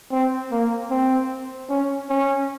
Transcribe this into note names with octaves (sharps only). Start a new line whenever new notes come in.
C4
A#3
C4
C#4
C#4